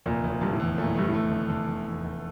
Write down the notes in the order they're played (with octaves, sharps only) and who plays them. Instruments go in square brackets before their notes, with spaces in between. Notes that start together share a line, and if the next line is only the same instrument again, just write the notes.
[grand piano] F1 [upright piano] A#2
[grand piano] F1
[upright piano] A#2
[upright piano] G2 [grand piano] D3
[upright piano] A2
[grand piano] E2
[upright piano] A#2 [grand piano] A3
[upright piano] A2
[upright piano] G2 [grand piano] A3
[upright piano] A2
[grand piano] A3
D3
D3
D3
E2
F1